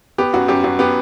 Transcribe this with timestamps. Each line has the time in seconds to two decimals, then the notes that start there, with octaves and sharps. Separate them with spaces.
0.18 B3 G4
0.34 F#2 F#4
0.48 F#2 G4
0.64 F#2 F#4
0.79 B3 G4